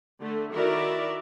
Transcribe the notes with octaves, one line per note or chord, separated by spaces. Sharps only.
D3 A3
D#3 E4 F#4 A#4 D5 E5